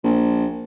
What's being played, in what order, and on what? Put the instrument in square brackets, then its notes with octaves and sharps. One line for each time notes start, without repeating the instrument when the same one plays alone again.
[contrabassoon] A#1